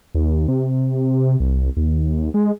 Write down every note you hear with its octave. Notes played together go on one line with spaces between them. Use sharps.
D#2
C3
C2
D#2
G#3